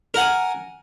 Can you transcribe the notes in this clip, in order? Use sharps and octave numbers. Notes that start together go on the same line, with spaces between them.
A#4 F#5 G#5